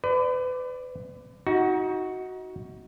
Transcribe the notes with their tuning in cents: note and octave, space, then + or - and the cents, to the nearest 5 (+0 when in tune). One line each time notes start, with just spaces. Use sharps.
B4 +35 D5 +0
D#4 +30 F#4 +0